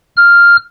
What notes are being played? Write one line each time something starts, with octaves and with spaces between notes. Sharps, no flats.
F6